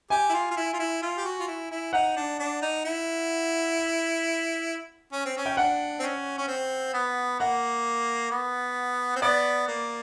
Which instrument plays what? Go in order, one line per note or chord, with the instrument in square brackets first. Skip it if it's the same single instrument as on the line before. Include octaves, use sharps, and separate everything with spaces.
[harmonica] G4 [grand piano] G#5
[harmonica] E4
F4
F4
E4
F4
E4
F4
G4
F#4
F4
E4
E4
[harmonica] D#4 [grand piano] F#5
[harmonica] D4
D4
D#4
E4
C#4
C4
C#4
[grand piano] G5
[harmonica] D4 [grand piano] F#5
[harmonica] C4
C#4
C#4
C4
B3
[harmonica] A#3 [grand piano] F#5
[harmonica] B3
C4
[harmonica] B3 [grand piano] D5
[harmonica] A#3